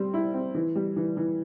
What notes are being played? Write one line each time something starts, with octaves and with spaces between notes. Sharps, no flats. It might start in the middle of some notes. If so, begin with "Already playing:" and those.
Already playing: G3 C4
E4
C4
E3
G3
E3
E3